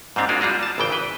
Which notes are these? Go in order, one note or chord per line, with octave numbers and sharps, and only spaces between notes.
G#2 G3 A#3 C4 D4 G4
G#3 A#3 D4 F4 F#4
G3 F4 F#4 G#4
A5
G#1 C#3 E3 G5
B4